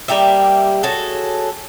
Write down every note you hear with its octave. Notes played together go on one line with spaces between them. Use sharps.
G3 A#3 G4 E5
F#4 G#4 A4 C#5